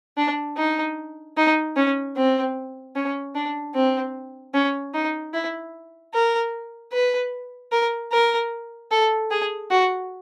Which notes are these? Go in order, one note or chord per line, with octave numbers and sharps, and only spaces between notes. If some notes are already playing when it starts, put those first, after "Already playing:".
D4
D#4
D#4
C#4
C4
C#4
D4
C4
C#4
D#4
E4
A#4
B4
A#4
A#4
A4
G#4
F#4